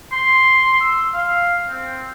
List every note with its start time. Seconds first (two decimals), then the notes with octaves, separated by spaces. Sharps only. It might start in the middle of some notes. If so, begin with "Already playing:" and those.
0.12 C6
0.81 E6
1.13 F5
1.69 C4